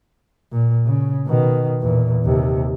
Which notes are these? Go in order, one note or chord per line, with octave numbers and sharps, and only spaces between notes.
A#2
C#3
B2 D#3
E2 A#2
D#2 C3